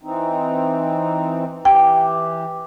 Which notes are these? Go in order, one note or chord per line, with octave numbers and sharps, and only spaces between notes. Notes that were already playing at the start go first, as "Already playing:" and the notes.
E3 C4 D#4
E3 G4 G5